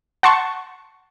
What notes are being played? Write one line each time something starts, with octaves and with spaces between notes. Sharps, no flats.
F#5 A5 C6 C#6